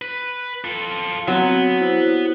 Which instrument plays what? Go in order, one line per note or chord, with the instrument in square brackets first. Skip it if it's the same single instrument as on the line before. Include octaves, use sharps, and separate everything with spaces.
[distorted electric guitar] B4
F4 A4
[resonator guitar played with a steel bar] F#3 [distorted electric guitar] B3 [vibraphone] C4
[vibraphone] E4 F#4 C5
G4